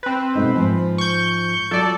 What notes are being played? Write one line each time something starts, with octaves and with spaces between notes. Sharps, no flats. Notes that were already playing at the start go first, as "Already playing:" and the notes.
C4 B4
B2 A3 D#4
G#2 F3
C#6 G6
F#3 F4 A4 D5